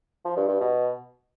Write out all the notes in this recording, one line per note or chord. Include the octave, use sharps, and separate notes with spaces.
F3
G2
G2
B2